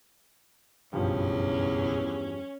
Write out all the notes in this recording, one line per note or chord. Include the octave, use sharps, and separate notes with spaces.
F#1 B1 E2 G2 F3 C#4